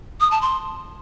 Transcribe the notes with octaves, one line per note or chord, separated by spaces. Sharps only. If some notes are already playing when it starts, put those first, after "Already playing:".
D#6
A5
C6